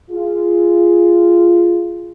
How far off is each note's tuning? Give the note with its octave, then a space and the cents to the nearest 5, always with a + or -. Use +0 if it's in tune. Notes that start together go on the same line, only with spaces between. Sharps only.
F4 -10 G#4 +0